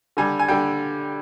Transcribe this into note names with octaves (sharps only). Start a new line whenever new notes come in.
D3 G3 G#5
G#5
D3 G3 G5